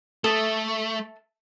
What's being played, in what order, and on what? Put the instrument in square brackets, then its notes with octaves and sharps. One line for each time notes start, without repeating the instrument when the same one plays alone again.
[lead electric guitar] A3 [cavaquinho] A4 E5 D#6